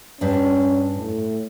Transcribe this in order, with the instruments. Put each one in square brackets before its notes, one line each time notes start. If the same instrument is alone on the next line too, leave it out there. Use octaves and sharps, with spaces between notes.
[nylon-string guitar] G2 D4 [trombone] C#4
[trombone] A2